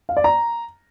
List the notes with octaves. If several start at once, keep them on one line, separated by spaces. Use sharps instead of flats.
F5
D5
A#5